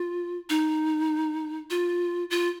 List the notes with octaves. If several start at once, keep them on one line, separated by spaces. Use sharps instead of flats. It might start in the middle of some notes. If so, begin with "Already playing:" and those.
Already playing: F4
D#4
F4
F4